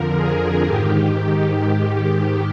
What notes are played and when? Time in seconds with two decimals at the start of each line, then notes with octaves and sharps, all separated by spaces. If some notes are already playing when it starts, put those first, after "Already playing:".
Already playing: F2 D3 F3 A#4
0.15 G#4
0.66 G#2 D#3 G4